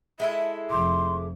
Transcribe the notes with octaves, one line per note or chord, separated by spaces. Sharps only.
G#3 E4 A4 E5
F1 F3 C6 D6